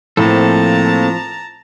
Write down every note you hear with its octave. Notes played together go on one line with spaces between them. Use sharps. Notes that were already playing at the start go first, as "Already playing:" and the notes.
A2 F3 A#3 C4 A4 A5 A#5